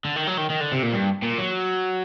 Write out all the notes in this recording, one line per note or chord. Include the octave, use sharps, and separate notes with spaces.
D3
D#3
F#3
D#3
D#3
D3
C3
A#2
G2
A#2
F#3